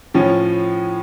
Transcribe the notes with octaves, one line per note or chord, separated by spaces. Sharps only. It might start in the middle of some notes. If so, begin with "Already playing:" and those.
A2 F3 C#4